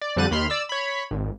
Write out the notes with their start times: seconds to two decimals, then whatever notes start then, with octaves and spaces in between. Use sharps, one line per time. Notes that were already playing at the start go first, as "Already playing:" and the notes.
0.01 D5
0.16 F2 D3 G3 F#6 A6 D#7
0.31 D#2 B5 C6 F6
0.50 D5 E6
0.69 C#5 B5
1.11 G#1